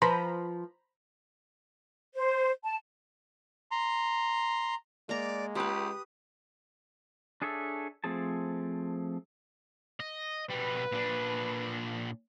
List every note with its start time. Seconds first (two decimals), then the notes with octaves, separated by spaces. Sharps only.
0.02 F3 B4 C5 A#5 B5
2.14 C5
2.64 A5
3.71 A#5 C6
5.09 G#3 A#3 D5 A#5
5.55 C#2 G4 B4 D#6
7.42 D4 G#4 A4 C#5 E5
8.04 F3 A3 C4 G#4 A5
10.00 D#5
10.50 B2 G3 B4
10.92 A#2 D4